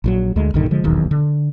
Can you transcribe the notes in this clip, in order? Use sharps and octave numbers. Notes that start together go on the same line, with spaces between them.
A#1 D#3 F#3
D2 D3 G#3
A#1 G2 D3 D#3
D3 F3 G#3
D#1 B1 E2 D#3
D3